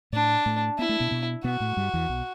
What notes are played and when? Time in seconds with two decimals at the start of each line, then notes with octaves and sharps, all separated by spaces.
0.13 A2 A3 D4
0.46 A2 A3
0.79 B3 E4
0.89 A3
1.00 B2 B3
1.11 B2 B3
1.44 B2 B3 F#4
1.60 A2 A3
1.77 G2 G3
1.94 E2 E3
2.09 B1 B2